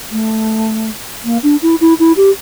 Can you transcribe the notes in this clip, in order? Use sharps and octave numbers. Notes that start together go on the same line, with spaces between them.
A3
A#3
D4
E4
E4
E4
G4